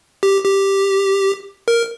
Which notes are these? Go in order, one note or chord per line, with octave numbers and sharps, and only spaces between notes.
G4
G4
A#4